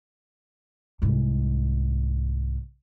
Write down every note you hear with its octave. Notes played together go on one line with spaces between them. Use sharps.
C2 G#2